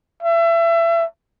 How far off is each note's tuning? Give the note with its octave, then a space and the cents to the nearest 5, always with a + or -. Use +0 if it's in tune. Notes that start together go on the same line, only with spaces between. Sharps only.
E5 +30